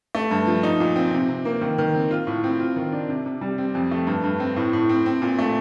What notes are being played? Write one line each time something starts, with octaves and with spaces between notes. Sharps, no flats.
A3
G2
F3
D#4
A#2
C4
C3
C3
A#3
D#3
D#3
C4
F4
A2
C4
F4
D#3
D4
C3
C3
G3
C4
F2
A3
G2
G2
C4
A2
A2
C4
C4
A#2
A3